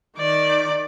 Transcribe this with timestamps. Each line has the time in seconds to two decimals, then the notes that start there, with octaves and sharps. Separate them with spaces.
0.18 D#3 D5